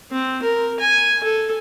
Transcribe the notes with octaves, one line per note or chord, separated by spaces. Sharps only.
C4
A#4
G#5
A4